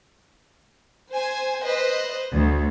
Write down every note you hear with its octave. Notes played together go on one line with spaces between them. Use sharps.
C5 G#5
B4 C5 D#5
D2